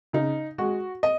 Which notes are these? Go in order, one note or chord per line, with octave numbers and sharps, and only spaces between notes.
C#3 D#4
G#3 F#4
D#5